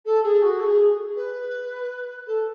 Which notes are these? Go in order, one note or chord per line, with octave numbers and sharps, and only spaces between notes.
A4
G#4
F#4
A4
G#4
B4
A4